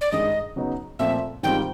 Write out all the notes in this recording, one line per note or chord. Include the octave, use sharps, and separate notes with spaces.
D5
G2 D#3 G#3 D#5
C#3 F#3 B3 D#4
A#2 F3 A3 C4 E5
G#2 D#3 G3 C4 F4 G5